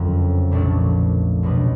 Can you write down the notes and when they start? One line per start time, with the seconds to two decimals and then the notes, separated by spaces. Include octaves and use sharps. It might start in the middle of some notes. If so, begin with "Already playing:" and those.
Already playing: F#1 F2 D3 F#3
0.51 A#1 A#2 F3 A3 D4
1.43 C#2 B2 F#3 B3 D4